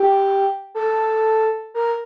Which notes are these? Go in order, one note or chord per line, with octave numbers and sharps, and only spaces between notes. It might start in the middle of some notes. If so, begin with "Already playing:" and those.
Already playing: G4
A4
A#4